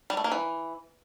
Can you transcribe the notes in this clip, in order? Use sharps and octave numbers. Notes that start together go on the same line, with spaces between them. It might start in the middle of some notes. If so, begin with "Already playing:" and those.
G3
A3
A#3
E3